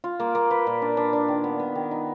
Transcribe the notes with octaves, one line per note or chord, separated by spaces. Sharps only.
F4
A#3
A#3
B4
A#2
D4
D4
D4
D#3
B3
B3
D#3
D#4